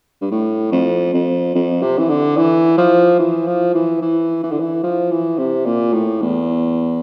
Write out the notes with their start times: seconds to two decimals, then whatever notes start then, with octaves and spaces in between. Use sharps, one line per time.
0.21 G2
0.31 A2
0.72 F2
1.14 F2
1.55 F2
1.82 C3
1.98 E3
2.09 D3
2.37 E3
2.78 F3
3.19 E3
3.47 F3
3.74 E3
4.02 E3
4.43 E3
4.52 D3
4.60 E3
4.83 F3
5.11 E3
5.38 C3
5.66 A#2
5.93 A2
6.21 E2